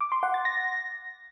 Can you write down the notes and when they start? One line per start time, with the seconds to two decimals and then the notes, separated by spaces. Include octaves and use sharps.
0.01 D6
0.12 C6
0.23 F#5
0.34 A6
0.45 A#6